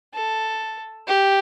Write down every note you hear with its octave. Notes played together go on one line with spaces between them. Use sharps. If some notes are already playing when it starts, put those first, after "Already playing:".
A4
G4